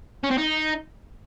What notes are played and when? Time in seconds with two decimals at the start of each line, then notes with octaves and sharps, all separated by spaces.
0.24 C#4
0.31 C4
0.38 D#4